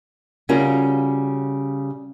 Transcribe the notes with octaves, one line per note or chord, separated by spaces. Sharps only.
C#3 G3 C#4 F4 F#4 A#4